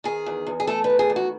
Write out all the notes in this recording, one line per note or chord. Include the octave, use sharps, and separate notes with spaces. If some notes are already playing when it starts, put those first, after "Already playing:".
D#3 G#4
E2
E2
G#4
A3 A4
B4
D#3
G#4
E2
F#4